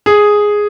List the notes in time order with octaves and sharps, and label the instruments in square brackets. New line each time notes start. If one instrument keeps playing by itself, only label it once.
[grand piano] G#4